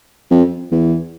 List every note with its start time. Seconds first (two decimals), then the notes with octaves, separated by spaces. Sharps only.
0.31 F2
0.72 E2